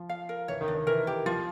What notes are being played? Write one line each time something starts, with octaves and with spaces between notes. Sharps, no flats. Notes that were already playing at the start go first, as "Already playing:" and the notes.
Already playing: F3
F5
A#4
E3 C#5
D#3
D4
D#3
E3 A#4
G4
F3 F4